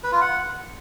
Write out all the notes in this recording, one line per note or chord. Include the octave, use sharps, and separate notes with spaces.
B4
F4
F#5